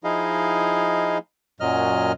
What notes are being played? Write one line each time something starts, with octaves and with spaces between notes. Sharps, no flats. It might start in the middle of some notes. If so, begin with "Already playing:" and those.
F3 D#4 E4 G#4 D#5 F5
F#2 A#2 F#3 D#5 F6